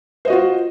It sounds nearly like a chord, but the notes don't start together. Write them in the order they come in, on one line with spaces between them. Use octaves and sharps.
C5 D#5 F#4 F4